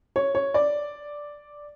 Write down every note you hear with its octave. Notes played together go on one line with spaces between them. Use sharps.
C#5
C#5
D5